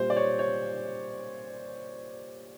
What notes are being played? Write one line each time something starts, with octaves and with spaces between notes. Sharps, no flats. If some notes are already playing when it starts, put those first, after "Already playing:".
Already playing: A#2 G3 C5
D5
C#5
C#5